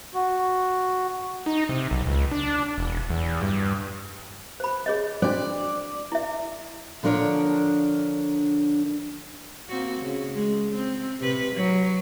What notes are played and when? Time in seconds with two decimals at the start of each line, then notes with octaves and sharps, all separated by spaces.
0.14 F#4
1.46 D#4
1.69 C3
1.91 B1
2.07 C#2
2.31 D4
2.78 E1
3.10 E2
3.41 G2
4.60 C5 B5
4.86 G#4 C#5 D#5
5.22 D4 F#4 C5 D5
6.12 E4 E5
7.03 D3 F3 D4 A#4 C#5
9.69 A#3 C4 F#4
10.01 C#3
10.35 G#3
10.75 C4
11.20 C3 B4
11.55 F#3